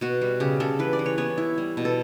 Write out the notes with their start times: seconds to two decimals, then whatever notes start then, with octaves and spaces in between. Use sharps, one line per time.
0.01 B2 F#4
0.21 G3
0.40 C#3 G4
0.60 C#3 A4
0.79 E3 B4
0.93 D5
0.99 E3
1.06 C#5
1.18 B3 C#5
1.38 E4
1.58 G3
1.77 B2
1.85 A4